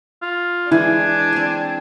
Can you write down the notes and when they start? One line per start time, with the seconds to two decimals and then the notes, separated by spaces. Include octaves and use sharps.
0.22 F4
0.72 E3 G#3 D4 E4 G#5
1.33 C4 C5